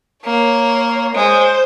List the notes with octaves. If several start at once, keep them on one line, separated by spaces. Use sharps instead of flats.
A#3 C#5
G#3 C5